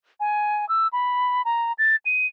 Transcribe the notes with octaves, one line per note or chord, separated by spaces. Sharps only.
G#5
E6
B5
A#5
A6
D#7